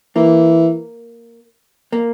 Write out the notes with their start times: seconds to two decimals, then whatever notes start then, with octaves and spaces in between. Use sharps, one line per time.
0.16 E3 A#3
1.92 A#3